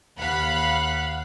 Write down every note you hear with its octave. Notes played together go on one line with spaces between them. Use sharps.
D#2 F5 F#5 B5 F#6